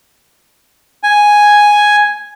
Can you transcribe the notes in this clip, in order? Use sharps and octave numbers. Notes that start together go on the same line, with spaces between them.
G#5